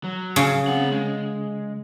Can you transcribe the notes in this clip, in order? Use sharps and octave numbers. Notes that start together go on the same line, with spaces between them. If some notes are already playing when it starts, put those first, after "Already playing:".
F#3
C#3
C4 F#5
G#3